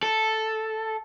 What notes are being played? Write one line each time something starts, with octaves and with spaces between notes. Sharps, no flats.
A4